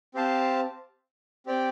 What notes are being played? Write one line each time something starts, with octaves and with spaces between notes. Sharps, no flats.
C4 G4 C5 F5 A5
C4 G4 D5 G5